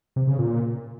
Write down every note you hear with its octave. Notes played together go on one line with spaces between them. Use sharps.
C3
C#3
A#2